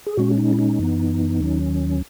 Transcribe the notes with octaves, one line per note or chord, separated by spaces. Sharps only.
G#4
A#2 G#3 C#4 F#4
D#4
E4
D#4
F#2 E3 B3
D#2 D#3 F#3 C#4